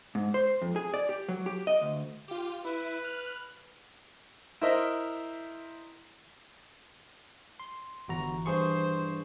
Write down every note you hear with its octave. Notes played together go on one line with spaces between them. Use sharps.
G#2
C5
F2
G#4
D5
G4
F#3
G4
D#5
D2
F4 G4
E4 B4
F6 F#6
E4 A#4 C5 D#5 E5
C6
G1 E3 F#4 A#5
G2 G#4 C5 C#6